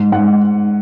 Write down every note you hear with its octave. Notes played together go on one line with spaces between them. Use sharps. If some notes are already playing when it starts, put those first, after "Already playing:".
Already playing: G#2
G#2 F#5